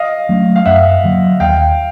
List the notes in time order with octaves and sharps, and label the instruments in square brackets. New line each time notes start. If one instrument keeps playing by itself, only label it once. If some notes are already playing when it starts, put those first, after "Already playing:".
Already playing: [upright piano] D#5 F5
[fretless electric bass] F#3 A3 C#4
[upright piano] F5
[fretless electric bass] F#2 [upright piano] E5 F#5
[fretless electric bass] D3 F#3 A#3
[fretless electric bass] D#2 [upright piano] F5 G5